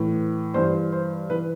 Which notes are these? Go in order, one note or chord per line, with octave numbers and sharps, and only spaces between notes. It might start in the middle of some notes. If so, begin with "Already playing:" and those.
Already playing: A2 E3
G2 E3 C5
C5
E3 B4